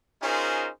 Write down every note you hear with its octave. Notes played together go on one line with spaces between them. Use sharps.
C#4 D#4 F4 G#4 A#4 C5